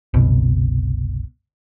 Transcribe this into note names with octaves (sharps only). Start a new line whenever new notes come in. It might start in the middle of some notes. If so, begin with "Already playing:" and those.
F#1 C2 B2